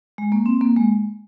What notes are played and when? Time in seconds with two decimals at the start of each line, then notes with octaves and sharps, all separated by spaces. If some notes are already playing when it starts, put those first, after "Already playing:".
0.18 G#3
0.32 A#3
0.46 C4
0.61 A#3
0.77 G#3